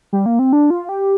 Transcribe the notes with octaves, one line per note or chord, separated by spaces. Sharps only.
G3
A#3
C4
D4
F4
G4